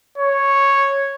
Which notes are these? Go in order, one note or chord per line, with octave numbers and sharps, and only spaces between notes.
C#5